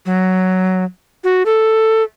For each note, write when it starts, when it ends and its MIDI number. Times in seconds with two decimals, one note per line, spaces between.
0.06 0.84 54
1.24 1.43 66
1.46 2.03 69